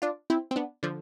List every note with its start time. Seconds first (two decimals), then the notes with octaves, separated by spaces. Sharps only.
0.02 D4 F4
0.30 C4 E4
0.51 C4
0.56 B3 D4
0.83 D3 F3